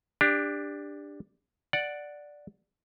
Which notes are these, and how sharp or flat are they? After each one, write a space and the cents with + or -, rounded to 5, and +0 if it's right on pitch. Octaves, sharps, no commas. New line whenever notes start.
D4 +0 G4 +25
D5 +0 F#5 +0